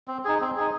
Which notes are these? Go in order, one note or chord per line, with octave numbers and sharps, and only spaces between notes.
C4
D#4 G#4
C4
D#4 G#4